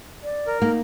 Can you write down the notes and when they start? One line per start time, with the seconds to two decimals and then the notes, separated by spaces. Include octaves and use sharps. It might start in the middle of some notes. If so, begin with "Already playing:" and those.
0.23 D5
0.47 A#4
0.62 A#3 D#4